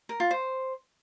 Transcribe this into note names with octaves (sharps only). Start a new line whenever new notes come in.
A#4
F4
C5